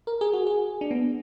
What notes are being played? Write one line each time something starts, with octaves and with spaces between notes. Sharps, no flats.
A#4
G#4
F#4
G#4
D4
B3